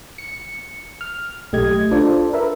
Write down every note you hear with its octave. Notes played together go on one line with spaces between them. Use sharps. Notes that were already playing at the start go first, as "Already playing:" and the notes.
C#7
F6
B1 A3 G4 D#5 G#6
D4 F4 A4 C5 D5
A#4 B4 E5